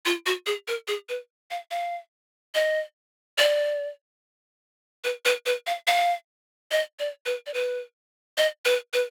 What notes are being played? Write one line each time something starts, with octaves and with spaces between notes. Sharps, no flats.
F4
F#4
G#4
A#4
G#4
B4
F5
F5
D#5
D5
B4
B4
B4
F5
F5
D#5
D5
B4
D5
B4
D#5
B4
B4